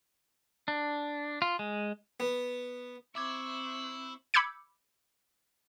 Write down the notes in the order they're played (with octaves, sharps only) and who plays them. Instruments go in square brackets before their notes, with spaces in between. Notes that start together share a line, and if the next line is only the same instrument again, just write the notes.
[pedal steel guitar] D4
F4
G#3
[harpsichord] B3
[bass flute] C4 [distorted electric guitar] E4 [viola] C5 C#6 [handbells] E5 D6 G#6
[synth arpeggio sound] B5 D6 E6 G6 G#6 C#7